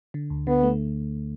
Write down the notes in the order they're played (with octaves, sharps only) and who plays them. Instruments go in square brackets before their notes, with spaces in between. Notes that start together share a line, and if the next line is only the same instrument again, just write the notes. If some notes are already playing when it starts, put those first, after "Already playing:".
[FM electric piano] D3
D2
[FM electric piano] D3 [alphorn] B3
[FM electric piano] A3